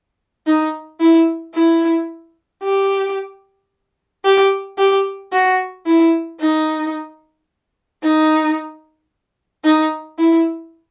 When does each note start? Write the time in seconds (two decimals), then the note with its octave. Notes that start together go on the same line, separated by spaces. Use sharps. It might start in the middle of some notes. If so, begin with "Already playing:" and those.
0.47 D#4
1.00 E4
1.55 E4
2.63 G4
4.24 G4
4.78 G4
5.32 F#4
5.86 E4
6.40 D#4
8.03 D#4
9.64 D#4
10.18 E4